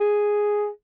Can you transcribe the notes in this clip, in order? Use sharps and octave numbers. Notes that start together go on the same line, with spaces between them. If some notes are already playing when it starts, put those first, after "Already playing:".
G#4